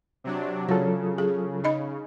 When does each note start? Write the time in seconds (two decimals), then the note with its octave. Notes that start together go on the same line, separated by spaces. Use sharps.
0.24 C3 F#3 D4
0.69 C#3 F#3 F4 A4 C#5
1.18 G#4
1.64 D#4 D#5 B5